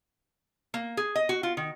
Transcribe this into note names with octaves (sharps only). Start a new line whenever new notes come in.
A#3
G#4
D#5
F#4
F4
D#3